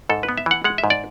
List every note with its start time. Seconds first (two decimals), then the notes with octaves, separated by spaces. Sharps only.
0.09 G#2 A4
0.23 B4
0.29 B3
0.38 E5
0.46 E3 F#5
0.64 G#3 F#5
0.78 E5
0.84 G#2
0.90 D5